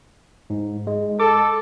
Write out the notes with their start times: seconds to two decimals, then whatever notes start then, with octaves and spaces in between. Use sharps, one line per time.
0.50 G#2
0.87 G#3
1.20 A4 D6